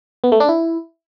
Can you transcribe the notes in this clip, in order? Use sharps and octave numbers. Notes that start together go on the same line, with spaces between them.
B3
A3
D4
E4